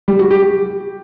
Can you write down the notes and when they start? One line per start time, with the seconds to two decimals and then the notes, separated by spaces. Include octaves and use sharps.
0.08 G3
0.19 F#4
0.31 G4
0.42 G4